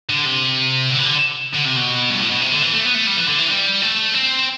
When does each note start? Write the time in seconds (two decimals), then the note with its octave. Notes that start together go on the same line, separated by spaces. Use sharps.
0.10 D3
0.26 C3
0.90 D3
0.99 E3
1.06 D3
1.55 D3
1.66 C3
1.77 B2
2.10 G2
2.19 A2
2.31 B2
2.41 C3
2.52 D3
2.62 E3
2.73 A3
2.85 B3
2.95 A3
3.07 G3
3.17 E3
3.28 D3
3.39 E3
3.48 G3
3.82 A3
4.14 C4